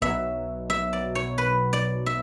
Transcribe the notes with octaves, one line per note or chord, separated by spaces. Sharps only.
B1 B2 F#3 E5
E5
D5
C#5
B4
D5
E5